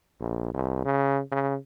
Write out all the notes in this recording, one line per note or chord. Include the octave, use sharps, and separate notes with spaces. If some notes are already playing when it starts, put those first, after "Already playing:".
A#1
C2
C#3
C#3